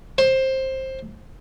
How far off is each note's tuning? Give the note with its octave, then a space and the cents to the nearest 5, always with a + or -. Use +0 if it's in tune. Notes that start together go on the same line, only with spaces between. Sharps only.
C5 +15